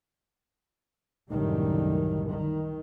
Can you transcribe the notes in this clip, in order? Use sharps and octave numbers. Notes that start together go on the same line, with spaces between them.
C2 F#2 A2 D3 D#3 G3
D#3